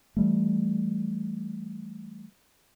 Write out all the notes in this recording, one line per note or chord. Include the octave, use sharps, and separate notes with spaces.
E3 G3 A3